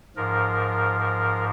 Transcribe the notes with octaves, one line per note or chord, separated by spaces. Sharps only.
G#2 F3 A#4
A#4